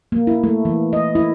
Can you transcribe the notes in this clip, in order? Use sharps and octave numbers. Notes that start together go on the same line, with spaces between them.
A#3
E4
A3
E3
D#5
E4